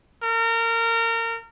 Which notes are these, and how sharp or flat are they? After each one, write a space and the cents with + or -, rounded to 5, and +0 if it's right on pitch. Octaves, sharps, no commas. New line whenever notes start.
A#4 -25